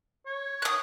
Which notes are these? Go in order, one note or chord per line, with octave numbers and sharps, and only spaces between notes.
C#5
D#6 F#6